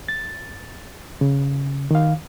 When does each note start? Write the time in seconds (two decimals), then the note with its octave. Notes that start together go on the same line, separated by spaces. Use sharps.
0.08 A6
1.21 C#3
1.91 D#3 F5